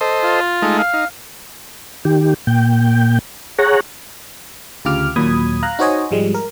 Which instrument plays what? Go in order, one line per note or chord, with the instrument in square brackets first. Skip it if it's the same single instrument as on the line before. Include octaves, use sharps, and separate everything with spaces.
[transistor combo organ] A4 C5 D#5
[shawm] F4
[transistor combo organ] G#3 A3 D#4
[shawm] F5
[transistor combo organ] D#4
[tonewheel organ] D#3 G4
A#2 G5
G#4 C#5 F#5 A#5
[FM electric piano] D2 C#3 F4 G4 D6 F6
D#2 A#2 F#3 B5 D#6 G#6
F5 A#5 F#6
D#4 F#4 C5 C#5 D#5 G#5
G#2 F3 G3 G#3
A#4